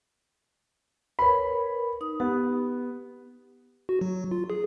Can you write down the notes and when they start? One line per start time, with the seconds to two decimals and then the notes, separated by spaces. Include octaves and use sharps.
1.19 A#4 B4 C#5 B5
2.01 D#4 D#6
2.20 B3 G4
3.89 F#4
4.01 F#3
4.31 F4
4.50 G#4